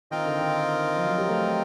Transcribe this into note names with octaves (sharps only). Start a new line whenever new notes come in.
D#3 C4 F4 A#4 D#5 G5
D3
D#3
F3
F#3
G3
A3